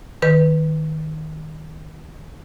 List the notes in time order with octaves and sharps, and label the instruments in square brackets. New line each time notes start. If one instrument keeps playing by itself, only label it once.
[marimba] D#3 B4